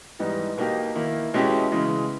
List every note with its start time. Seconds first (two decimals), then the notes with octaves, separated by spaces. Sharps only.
0.19 G#2 E3 G3 B3 D#4
0.58 B2 A#3 D#4 G4
0.95 D#3 A#3 E4
1.34 B2 G#3 C#4 E4 G4
1.72 C#3 E3 G#3